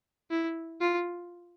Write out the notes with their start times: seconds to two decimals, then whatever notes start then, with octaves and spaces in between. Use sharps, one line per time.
0.31 E4
0.81 F4